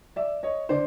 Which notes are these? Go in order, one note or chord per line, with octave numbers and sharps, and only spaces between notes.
D5 E5
C#5 D#5
D3 C5 D5